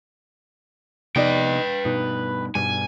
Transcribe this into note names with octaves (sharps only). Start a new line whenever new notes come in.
C3 F3 B3 D#4 B4 D5 D#5 G5
G2 B2 D#4
G2 B2 G3 G#5